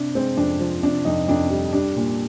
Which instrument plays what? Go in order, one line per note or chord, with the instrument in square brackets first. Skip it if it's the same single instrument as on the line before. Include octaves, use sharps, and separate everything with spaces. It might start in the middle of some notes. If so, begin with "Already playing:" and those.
Already playing: [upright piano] C3 D4
G#3 C4
F2 D4
F3
C3 D4
F2 D#4
F2 D4
G3
G3 D4
A#2